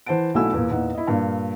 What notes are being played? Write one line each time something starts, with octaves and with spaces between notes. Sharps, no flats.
E3 C5 F#5 A5 D7
B1 A3 E4 F#4 G#5 E6
E2 A#2
E2 A#2 D#4 F#5
E4 D#5
G2 A#2